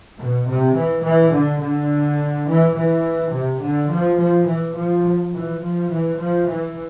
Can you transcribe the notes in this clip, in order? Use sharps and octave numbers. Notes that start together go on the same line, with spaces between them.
B2
C3
E3
E3
D3
D3
E3
E3
C3
D3
F3
F3
E3
F3
E3
F3
E3
F3
E3